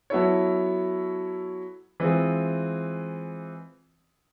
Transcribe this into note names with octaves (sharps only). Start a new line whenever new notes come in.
F#3 B3 E4 A4 C#5
E3 G#3 C4 F4 G#4